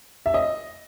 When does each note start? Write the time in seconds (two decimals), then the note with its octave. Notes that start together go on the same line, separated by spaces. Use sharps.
0.26 E5
0.34 D#5